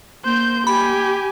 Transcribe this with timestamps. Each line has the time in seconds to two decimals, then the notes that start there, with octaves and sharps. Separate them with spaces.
0.25 A#3 C5 G6
0.67 G4 G#5 B5